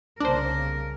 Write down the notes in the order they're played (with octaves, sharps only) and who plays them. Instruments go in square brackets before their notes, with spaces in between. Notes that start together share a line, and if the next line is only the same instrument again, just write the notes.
[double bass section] C2 C#3 A#3 [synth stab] D4 C5 [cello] A#4